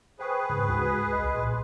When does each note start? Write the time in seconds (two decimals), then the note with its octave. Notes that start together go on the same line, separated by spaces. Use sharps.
0.19 G#4 B4 C5 G5 C#6
0.50 G#2 C#3
0.66 D2 G#3 F#4
0.90 B6
1.13 C2 D#5
1.35 A#2 C6